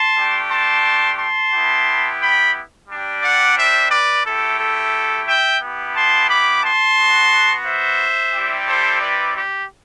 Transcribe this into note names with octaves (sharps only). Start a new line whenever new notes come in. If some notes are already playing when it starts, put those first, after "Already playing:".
Already playing: A5 C6
A3 D4 G4
A5 C6
A5 C6
B3 E4 G4
G5 B5
G3 D4 G4
D5 F#5
C5 E5
B4 D5
A3 E4 G4 A4
A4
E5 G5
B3 E4 G4
A5 C6
B5 D6
A5 C6
B3 F#4
C5 E5
G3 C4 E4 G4
A4 C5
B4 D5
G4